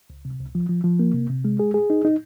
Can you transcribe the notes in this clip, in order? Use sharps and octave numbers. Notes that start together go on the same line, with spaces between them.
C#2
C3
C#2
F3
F3
F3
A#3
C3
C3
G#3
G#4
G#4
D#4
D#4